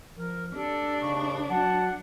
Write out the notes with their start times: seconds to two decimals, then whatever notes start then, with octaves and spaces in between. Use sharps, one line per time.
0.17 F3 A#4
0.55 D4 G4 A4
1.01 D#2 C#3 C#6
1.49 F#3 F#5 A5